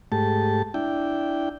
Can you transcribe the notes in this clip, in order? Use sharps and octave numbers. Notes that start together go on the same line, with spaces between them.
G#2 A3 G4 A5
D4 E4 G5